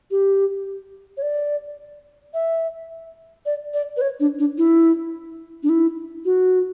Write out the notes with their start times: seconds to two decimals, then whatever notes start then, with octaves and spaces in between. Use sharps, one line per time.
0.11 G4
1.17 C#5
1.22 D5
2.34 E5
3.46 D5
3.74 D5
3.97 B4
4.01 C#5
4.20 D4
4.39 D4
4.58 E4
5.63 D4
5.69 E4
6.25 F#4